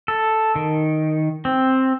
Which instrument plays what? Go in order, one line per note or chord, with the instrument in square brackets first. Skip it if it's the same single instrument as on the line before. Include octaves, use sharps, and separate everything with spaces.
[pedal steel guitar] A4
D#3
C4